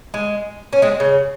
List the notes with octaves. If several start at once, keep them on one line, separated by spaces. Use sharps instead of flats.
G#3
C#4
G#3 C4
C#3